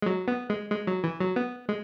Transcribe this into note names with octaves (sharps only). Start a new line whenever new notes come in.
G#3
F#3
B3
G#3
G#3
F#3
E3
F#3
B3
G#3